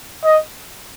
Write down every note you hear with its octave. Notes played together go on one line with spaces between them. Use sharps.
D#5